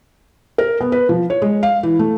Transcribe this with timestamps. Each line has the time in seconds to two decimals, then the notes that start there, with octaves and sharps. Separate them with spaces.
0.58 A#4
0.81 B3
0.92 B4
1.09 F3
1.30 C#5
1.42 G#3
1.63 F5
1.83 E3
1.99 A3